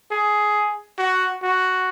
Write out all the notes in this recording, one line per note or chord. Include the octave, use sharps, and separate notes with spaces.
G#4
F#4
F#4